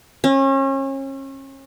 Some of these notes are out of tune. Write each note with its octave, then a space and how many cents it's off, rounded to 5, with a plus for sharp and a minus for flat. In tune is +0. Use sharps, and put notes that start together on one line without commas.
C#4 -35